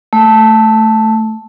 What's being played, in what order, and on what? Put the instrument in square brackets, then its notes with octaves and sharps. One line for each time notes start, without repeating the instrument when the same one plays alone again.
[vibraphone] A3